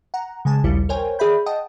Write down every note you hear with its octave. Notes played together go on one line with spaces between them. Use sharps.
F#5 A#5
C#3 G#3 G#5 A5
A#1 D#2 G3 E4 C#7
A#4 C5 C#5 G5 G#5
G#4 D5 E5 B5 G6
D#5 F#5 G5 A5 D#6